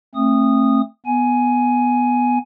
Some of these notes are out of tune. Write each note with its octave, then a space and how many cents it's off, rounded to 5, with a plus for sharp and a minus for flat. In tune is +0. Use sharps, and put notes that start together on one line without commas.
A3 +15 C4 +35 D#6 -15
B3 +0 G#5 +10